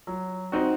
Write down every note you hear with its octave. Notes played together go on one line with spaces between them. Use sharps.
F#3
C4 D#4 F#4